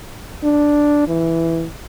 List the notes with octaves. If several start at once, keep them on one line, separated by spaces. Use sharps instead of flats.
D4
E3